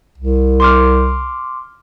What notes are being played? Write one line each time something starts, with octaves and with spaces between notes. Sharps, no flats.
C2
C6 D6 F6